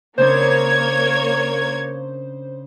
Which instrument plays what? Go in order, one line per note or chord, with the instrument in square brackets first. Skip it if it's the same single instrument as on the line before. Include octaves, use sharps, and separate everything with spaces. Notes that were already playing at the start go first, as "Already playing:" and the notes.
[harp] C#3 C4 D4 [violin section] A#3 C#5 G#6 [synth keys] C5